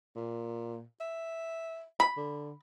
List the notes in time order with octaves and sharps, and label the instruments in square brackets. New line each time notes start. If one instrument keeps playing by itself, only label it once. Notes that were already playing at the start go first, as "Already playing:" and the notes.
[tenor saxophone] A#2
E5
[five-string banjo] B5
[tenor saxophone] D3